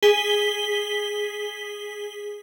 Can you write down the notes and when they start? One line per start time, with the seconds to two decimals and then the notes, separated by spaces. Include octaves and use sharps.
0.03 G#4 B6 G7